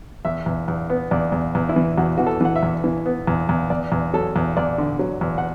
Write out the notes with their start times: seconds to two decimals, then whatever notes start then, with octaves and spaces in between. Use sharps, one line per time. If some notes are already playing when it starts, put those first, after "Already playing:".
0.25 E2 E5
0.46 E2
0.68 E2
0.90 B3
1.11 E2 D5
1.32 E2
1.55 E2
1.69 E4
1.76 E3
1.98 E2 F#4
2.18 E3 F#4
2.27 A4
2.41 E3 F#5
2.56 E5
2.63 E2
2.84 E3
3.06 B3
3.27 E2
3.49 E2
3.70 E2 D5
3.92 E2
4.14 F#3 A4
4.36 E2
4.57 E2 D5
4.78 D3
4.99 F#3
5.21 E2
5.38 F#5